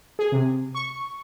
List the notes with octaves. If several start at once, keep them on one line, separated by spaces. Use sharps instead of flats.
G#4
C3
C#6